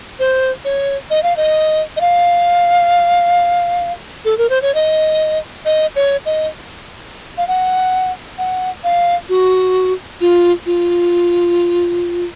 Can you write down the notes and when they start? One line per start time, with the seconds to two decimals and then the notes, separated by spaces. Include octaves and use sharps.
0.19 C5
0.65 C#5
1.10 D#5
1.23 F5
1.37 D#5
1.97 D#5
2.01 F5
4.25 A4
4.38 A#4
4.50 C5
4.62 C#5
4.75 D#5
5.65 D#5
5.96 C#5
6.26 D#5
7.38 F5
7.48 F#5
8.38 F#5
8.84 F5
9.29 F#4
10.21 F4
10.66 F4